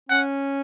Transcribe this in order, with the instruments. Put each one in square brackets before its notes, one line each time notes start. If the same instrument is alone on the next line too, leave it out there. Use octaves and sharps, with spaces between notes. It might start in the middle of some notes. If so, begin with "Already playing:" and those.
[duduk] C#4 [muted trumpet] F#5